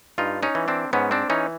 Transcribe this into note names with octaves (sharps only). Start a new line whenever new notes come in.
G2 D#4 F4
C#4 D#4
E3
C4 D4
G#2 B3 C#4
C4 D4
E3 C#4 D#4